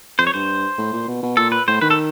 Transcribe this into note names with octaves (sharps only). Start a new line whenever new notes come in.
F2 C5
C#5
G2 C5
A2
A#2
B2
B2
A#2 A4
B4
A2 C5
D#3 B4
A4